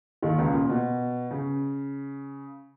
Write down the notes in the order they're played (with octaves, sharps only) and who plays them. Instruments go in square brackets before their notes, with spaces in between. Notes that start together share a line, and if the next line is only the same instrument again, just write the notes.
[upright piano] D#2 D#3
C#2 C#3
A#2
B2
C#3